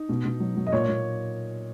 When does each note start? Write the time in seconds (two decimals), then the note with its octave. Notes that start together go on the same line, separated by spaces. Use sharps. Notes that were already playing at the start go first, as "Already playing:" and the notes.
Already playing: D#4
0.09 B2
0.25 B2
0.40 F#3
0.57 F#3
0.67 D#5
0.72 A#2 C#5
0.88 A#2